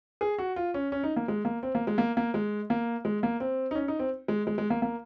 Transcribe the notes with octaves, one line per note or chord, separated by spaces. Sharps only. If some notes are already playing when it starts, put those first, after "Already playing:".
G#4
F#4
F4
C#4
C#4
D#4
A#3
G#3
A#3
C4
A#3
G#3
A#3
A#3
G#3
A#3
G#3
A#3
C4
D#4
C#4
D#4
C4
G#3
G#3
G#3
A#3
A#3